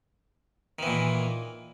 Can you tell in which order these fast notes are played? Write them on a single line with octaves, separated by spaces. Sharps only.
D#3 E3 A#2